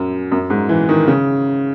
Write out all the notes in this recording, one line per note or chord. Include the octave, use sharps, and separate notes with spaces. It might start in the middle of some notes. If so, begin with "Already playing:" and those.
Already playing: F#2
F#2
G#2
E3
D#3
C#3